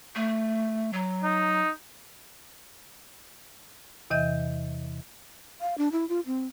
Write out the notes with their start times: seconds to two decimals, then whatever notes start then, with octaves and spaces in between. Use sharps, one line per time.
0.16 A3
0.93 F#3
1.24 D#4
4.10 E2 C3 E3 D#5 E5 G6
5.61 F5
5.78 D4
5.92 E4
6.09 F4
6.26 C4